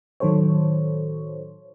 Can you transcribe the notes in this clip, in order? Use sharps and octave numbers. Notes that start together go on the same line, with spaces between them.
A2 D#3 F#3 A4 C5 C#5